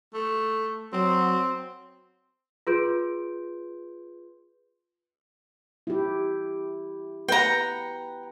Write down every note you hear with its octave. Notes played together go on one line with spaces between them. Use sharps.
A3
F#3 C4
F4 G#4 B4 C6 G6 D7
E4 G4
B4 F#5 G5 A#5